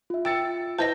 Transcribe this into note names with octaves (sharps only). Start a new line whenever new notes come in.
F4 E5
G5 E6 A6 C#7
E4 B4 C5 D#5 A5 G6 A#6